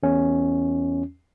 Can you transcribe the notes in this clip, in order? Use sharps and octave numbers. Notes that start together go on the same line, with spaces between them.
E2 C#4